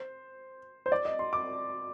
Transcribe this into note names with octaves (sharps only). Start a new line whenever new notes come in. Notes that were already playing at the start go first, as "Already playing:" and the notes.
Already playing: C5
C5
D5
D#5
C6
D6